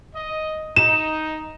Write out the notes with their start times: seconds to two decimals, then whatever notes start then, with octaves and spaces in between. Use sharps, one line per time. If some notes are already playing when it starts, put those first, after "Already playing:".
0.15 D#5
0.76 D#4 E7